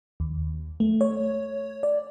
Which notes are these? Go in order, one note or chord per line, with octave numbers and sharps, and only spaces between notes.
D#2
A3
C#5
D5